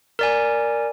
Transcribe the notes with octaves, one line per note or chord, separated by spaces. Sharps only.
A#4 D5 G#5